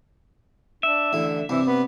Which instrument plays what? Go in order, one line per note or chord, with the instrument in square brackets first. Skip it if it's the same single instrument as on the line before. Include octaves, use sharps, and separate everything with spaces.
[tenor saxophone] D4 [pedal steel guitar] E5
[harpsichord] A1 E4 [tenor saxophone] D3
[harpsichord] G2 C3 [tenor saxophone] E3
[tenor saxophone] B3